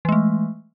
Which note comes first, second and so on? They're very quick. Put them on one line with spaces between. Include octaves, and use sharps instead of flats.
E3 G#3 A3